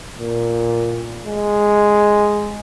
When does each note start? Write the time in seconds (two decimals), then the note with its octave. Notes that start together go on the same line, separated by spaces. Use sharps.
0.20 A#2
1.26 G#3